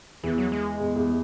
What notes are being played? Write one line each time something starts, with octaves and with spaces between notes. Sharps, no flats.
E2 E3
F#3
G#3
E2
E2